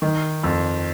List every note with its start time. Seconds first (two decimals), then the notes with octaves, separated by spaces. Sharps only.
0.02 D#3
0.43 F2